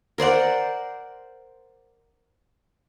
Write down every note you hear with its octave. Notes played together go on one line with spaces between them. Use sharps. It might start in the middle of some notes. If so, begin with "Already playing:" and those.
A#4 C5 D5 F#5